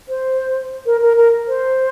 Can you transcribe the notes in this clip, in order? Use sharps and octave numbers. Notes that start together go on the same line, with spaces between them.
C5
A#4
A#4
A#4
C5